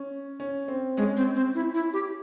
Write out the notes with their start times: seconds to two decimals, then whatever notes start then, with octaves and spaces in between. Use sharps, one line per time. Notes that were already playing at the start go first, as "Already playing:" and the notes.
Already playing: C#4
0.40 C#4
0.68 C4
0.97 G#3 C#4
1.17 C4
1.35 C4
1.55 E4
1.74 E4
1.93 G4